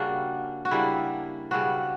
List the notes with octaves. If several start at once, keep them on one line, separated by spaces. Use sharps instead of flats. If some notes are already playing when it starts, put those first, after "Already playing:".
Already playing: C#3 G3 A#3 D4 F#4
F#4
C#3 G3 A#3 D4 E4
C#3 G3 B3 D4 F#4